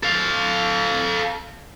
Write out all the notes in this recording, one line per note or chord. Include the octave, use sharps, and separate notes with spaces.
A4 F5